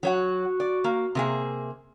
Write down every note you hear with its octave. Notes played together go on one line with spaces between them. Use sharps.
F#3 F#4 C#5 F#5
D5
A#3
C3 A#3 G#4